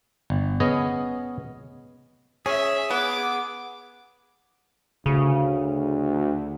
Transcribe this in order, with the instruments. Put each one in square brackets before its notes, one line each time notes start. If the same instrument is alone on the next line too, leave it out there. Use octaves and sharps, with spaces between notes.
[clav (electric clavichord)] G1
B3 C#4 G#4 D#5 G#5
[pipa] C#4 [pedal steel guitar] G#4 [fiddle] E5
[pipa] B3 [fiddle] D6
[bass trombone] D2 [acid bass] C#3